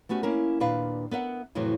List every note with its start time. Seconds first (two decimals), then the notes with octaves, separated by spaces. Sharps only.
0.09 A3 B3 C#4 F#4 G4
0.23 A#3 C#4 E4 A#4
0.60 D#2 A#2 D4 B4 F5
1.11 B3 A#4 E5 F#5
1.55 F2 A2 C3 E3 F#3